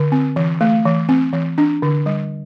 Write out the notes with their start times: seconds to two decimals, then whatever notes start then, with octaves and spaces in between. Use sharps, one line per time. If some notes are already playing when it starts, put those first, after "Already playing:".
Already playing: D3
0.12 C4
0.36 E3
0.61 A3
0.85 E3
1.09 C4
1.33 E3
1.58 D4
1.82 D3
2.06 G3